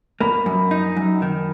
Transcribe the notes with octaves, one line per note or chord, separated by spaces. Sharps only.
A#3 B5
F#2
D#4
F#2
D#3